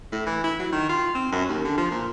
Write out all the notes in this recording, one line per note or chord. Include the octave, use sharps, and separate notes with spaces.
A2
E3
E4
F#3
D#3
F4
C4
F#2
D#2
D3
F3
A#2